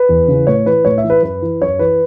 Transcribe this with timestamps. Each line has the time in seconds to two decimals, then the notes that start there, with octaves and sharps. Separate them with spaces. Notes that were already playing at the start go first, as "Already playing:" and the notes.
Already playing: B4
0.09 E2
0.28 C#3
0.33 E3
0.47 A2 C#5
0.66 E3 B4
0.85 A2 C#5
0.98 E5
1.04 E3
1.10 B4
1.22 F#2 B4
1.42 E3
1.62 F#2 C#5
1.79 E3 B4